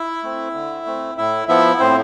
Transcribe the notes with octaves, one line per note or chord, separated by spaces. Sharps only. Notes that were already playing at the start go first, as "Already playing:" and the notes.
Already playing: E4 E5
A3 C4
D3
A3 C4
A2 E4 E5
F3 B3 E4 E5
A2 C4 C5